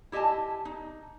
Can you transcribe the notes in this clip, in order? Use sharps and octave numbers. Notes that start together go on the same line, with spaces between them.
E4 G4 D#5 G#5 A5
D#4